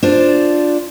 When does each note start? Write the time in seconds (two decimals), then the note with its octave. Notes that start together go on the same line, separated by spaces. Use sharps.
0.03 D4 F4 C5